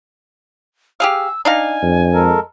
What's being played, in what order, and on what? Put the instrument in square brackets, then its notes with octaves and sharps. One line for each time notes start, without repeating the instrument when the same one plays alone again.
[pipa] G4 G#4 F5 [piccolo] E6
[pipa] D4 D#4 F5 [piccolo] G#5
[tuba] F2
[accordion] G#3 A4 A#4